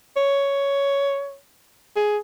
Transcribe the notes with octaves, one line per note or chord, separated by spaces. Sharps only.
C#5
G#4